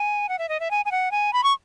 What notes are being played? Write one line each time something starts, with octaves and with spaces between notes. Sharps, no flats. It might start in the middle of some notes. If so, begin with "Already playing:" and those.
Already playing: G#5
F#5
E5
D#5
E5
G#5
G#5
F#5
G#5
B5
C#6